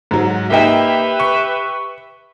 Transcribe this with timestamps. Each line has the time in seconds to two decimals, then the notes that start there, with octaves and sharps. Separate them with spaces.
0.11 G#2 F#3
0.51 A#3 D#4 G4 B4 E5 G5
1.20 C#6